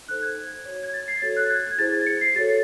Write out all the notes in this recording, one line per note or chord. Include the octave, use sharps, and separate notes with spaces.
D#4 A4 C5 F#6
G#6
F#4 C#5
G#6
A6
C7
F#4 A4 C#5 A6
F#6
G#6
G#6
E4 G#4 C5 A6
C#7
C7
F#4 A4 C#5 A6